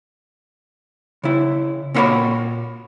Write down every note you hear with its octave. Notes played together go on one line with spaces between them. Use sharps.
C#3 E4
A#2 C#4 F#4 B4 C#5 B5